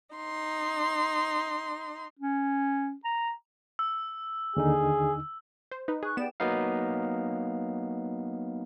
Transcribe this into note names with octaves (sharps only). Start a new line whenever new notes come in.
D#4 C6
C#4
A#5
E6
D#2 D3 D#4 G#4
C5
D#4 B4
G#4 C#6 F#6
B3 G4 D5 G5 E7
F#3 A#3 B3 D#4 F5